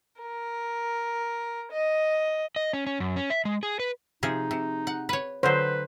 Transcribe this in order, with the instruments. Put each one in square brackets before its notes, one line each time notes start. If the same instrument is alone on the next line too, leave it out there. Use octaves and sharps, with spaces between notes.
[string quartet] A#4
D#5
[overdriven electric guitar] D#5
C#4
C#4
F#2
C#4
E5
G#3
G#4
B4
[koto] C3 F3 G#4 [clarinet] D#4
[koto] C3
F#5
B4 C#5
[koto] D3 F#3 [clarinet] B4 [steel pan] C5